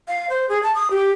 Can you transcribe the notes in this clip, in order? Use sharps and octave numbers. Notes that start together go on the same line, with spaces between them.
F5
C5
G#4
A5
D#6
G4